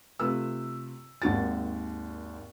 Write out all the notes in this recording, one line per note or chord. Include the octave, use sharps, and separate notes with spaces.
C3 A3 F4 B4 E6
G#1 D#2 F#4 A6